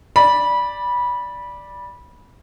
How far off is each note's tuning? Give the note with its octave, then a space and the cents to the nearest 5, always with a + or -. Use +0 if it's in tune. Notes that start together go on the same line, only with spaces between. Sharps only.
D5 +0 B5 -20